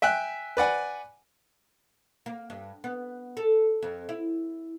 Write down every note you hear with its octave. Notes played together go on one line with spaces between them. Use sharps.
E5 G5 G#5 F#6
B4 D5 F#5 G#5
A#3
G2
B3
A4
F2
E4